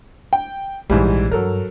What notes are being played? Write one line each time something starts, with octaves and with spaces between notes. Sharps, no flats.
G5
A#1 G#2 E3 G3
G2 F#3 A4 A#4